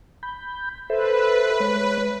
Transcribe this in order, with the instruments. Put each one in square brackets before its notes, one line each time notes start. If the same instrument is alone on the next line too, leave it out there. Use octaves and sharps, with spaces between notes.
[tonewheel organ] B5 G6
[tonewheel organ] A4 C5 E5 [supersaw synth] B4
[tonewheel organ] G#3 C#5